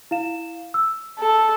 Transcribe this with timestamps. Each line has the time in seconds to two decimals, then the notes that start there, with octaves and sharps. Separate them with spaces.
0.11 E4 F5 E7
0.74 E6
1.20 A4